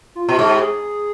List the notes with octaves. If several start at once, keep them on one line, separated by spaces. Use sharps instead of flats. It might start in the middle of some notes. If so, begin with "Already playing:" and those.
F4
B2
G#2 G4
G#4